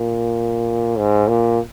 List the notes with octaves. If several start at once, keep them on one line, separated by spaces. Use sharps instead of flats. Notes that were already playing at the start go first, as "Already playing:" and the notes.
Already playing: A#2
G#2
A#2